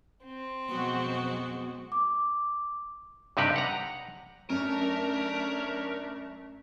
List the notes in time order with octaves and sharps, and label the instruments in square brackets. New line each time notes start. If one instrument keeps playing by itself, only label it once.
[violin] C4
[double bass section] F2 B2 [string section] F#3 G#3 F#4 [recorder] B3
[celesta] D6
[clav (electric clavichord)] G2 C3 D#4 G4 B4
F#5 A#5
[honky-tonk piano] F#2 [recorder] A3 [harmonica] D4 C#5 [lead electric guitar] A#4